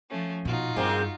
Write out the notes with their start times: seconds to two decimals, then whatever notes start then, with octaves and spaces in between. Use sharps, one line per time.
0.10 F3 A3 C#4
0.45 B2 D#4 F4 F#4
0.76 G2 G#3 A#3 C4